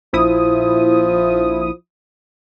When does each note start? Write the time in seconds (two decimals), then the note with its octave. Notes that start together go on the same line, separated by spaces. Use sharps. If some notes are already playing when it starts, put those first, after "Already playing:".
0.13 A#1 F3 E4 D#6